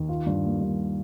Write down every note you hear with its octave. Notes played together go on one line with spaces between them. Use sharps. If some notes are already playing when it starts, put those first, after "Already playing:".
Already playing: D#2
F4
G2
A#3
G2